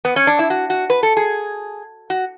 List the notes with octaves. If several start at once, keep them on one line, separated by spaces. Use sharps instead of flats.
B3
C#4
D4
E4
F#4
F#4
B4
A4
G#4
F#4